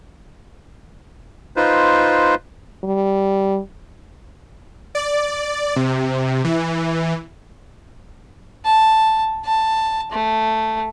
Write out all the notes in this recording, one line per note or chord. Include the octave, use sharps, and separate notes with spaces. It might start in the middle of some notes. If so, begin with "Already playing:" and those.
D#4 F4 B4 C5
G3
D5
C3
E3
A5
A5
A3